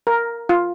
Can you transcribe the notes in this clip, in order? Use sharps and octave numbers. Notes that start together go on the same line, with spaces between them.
A#4
F4